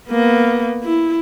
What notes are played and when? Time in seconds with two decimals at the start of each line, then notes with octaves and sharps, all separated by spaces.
0.11 A#3 B3
0.84 E4